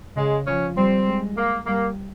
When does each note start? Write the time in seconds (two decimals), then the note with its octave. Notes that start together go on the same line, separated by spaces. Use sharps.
0.16 C#3 G#3
0.46 F3 C#4
0.76 G3 C4
1.06 G#3
1.37 A#3
1.66 G3 A#3